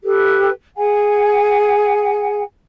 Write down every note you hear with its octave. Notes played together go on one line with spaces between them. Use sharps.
G4 A4 B4
G#4 F#5 G#5